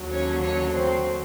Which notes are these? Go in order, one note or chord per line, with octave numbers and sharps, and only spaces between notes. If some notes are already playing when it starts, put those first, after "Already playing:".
Already playing: D#2 D3 F#3
C#4 C#5
C#4 C#5
C4 C5